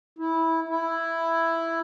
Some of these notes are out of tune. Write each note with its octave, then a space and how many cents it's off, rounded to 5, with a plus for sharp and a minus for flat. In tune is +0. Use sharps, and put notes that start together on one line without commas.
E4 -15
E4 +5